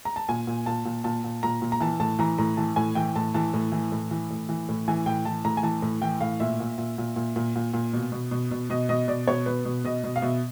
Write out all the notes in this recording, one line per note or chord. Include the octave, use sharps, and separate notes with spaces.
A#5
A5
A#2 G#5
A#2
A#2 A5
A#2
A#2 A5
A#2
A#2 A#5
A#2
A#5
E3 A5
A2 A5
E3 A#5
A2 A#5
E3 A5
A2 G#5
E3 G5
A2 A5
E3 A5
A2
E3
A2
E3
A2
E3
A2
E3 G#5
A2 G5
E3 A5
A2 A#5
G#5
E3 A5
A2
E3 G5
A2 F5
A#2 E5
A#2
A#2
A#2
A#2
A#2
A#2
A#2
B2
B2
B2
B2
B2 D#5
B2 D#5
B2 D5
B2 C#5
B2 B4
B2
B2 D#5
B2
F5
B2 E5